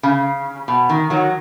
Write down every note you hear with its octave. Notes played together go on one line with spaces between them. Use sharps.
C#3
B2
D#3
D#3 F#3